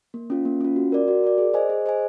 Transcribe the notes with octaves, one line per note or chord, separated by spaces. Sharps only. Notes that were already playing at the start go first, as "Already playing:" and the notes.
A#3
C#4 F4
A#3
C#4 F4
F#4
A#4 D5
F#4
A#4 D5
G#4
C5 D#5 G#5
G#4
C5 D#5 G#5